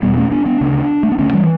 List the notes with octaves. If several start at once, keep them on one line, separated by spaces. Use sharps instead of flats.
E2 B2 G3 B3
A3 C#4
B3 D4
B3 D4
D2 C#3
A3
B3
D2 D3 A3 C#4
E3 G3